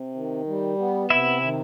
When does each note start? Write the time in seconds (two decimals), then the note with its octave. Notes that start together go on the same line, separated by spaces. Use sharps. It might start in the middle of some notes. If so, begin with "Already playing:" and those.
Already playing: C3
0.14 D#3
0.47 G3
0.78 B3
1.10 C3 E4 E5
1.42 D#3